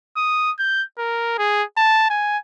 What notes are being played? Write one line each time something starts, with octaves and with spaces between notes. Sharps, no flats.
D#6
G6
A#4
G#4
A5
G#5